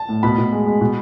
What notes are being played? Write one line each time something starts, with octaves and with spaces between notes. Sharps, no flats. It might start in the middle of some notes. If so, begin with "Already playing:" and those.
Already playing: A5
A2
B2 B5
B2
G#3
G#3
B2